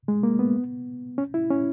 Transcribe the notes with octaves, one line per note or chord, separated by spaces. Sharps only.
G#3
A#3
B3
C#4
E4
C#4